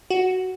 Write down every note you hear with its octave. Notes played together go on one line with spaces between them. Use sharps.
F#4